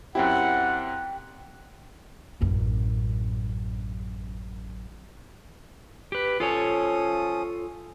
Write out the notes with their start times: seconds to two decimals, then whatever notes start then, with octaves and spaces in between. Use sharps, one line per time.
0.15 F#2 C4 E4 G4 F#5
2.41 A1 F#2
6.12 G4 B4
6.40 F3 C#4 F4 A4 C#5 D#6